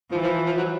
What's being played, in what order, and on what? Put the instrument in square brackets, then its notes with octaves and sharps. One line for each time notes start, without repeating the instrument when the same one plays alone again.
[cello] E3 [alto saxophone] F3
[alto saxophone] F3
F3
F3
F#3